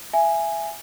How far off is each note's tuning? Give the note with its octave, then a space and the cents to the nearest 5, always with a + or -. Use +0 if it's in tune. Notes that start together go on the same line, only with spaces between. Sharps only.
E5 +25 G#5 +0